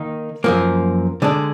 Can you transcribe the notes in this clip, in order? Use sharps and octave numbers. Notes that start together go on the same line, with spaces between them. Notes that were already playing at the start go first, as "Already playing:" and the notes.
Already playing: D#3 A#3 D#4
F#2 F3 A#3
D3 G#3 D4